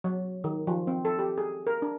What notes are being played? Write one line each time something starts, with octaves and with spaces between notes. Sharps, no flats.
F#3
D#3
F3
C4
A4
G4
G#4
A#4
D4